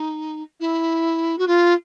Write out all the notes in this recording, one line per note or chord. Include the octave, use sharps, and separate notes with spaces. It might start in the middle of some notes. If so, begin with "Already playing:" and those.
Already playing: D#4
E4
F#4
F4